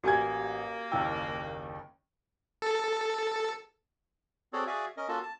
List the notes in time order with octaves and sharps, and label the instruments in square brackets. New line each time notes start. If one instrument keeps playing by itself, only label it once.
[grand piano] A1 G#6 [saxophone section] A#3 [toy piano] F#4 G4 G#5
[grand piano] F#1 D#2 G5 [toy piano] E4 E6
[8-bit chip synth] A4
[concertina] C4 F#4 G#4 A4 C#5 D5
F#4 G#4 D5 E5 F5 G#5
C#4 A#4 D#5
A#3 C#4 F4 F#4 A4 A5
A5